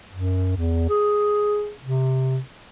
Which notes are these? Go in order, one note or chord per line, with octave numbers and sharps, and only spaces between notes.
F#2
E2
G#4
C3